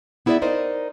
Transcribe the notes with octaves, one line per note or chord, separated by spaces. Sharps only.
B3 E4 G#4 A#4 D5 E5
D#4 A#4 C5 D5 D#5